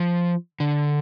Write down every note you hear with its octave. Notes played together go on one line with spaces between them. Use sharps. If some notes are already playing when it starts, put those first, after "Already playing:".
Already playing: F3
D3